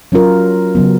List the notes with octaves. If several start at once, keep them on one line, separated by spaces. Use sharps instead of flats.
F#3 C#4 F4 A#4
C#3 F#3 B3